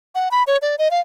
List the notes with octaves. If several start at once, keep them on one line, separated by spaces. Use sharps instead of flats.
F#5
B5
C#5
D5
D#5
F5